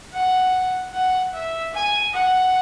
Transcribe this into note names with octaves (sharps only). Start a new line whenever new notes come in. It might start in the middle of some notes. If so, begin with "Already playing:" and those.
F#5
F#5
E5
G#5
F#5